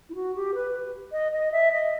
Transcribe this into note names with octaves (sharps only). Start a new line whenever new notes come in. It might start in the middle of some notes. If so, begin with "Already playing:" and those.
E4
F#4
G4
B4
D#5
D#5
E5
D#5